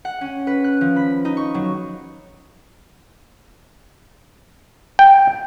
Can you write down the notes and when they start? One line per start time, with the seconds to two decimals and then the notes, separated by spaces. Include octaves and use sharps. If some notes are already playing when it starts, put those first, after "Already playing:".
0.05 F#5
0.21 C#4
0.47 B4
0.64 F#6
0.81 F3
0.96 B5
1.25 D#4
1.37 C#6
1.54 F#3
4.99 G5